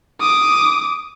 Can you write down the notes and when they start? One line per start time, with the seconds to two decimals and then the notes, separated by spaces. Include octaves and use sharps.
0.20 D6 D#6